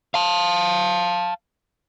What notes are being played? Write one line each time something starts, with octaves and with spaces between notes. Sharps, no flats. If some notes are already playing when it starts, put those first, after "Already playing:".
F5 A5